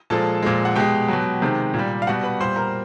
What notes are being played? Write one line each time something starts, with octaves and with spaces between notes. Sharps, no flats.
A#2 F3 G#3 A4 A5
A#2 F3 G#3
F#5
B2 G#3 G4 G5
B2 F#3
C3 D#3 G#3
A#2
G3
F5
B2 G3 F#4 F#5
B4 B5
A#2 G3 C5 C6
A#4 A#5